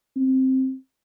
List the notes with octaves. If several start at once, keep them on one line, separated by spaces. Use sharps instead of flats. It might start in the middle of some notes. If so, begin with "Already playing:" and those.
C4